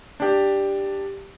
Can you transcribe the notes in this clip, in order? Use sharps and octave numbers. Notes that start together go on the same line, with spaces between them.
D4 G4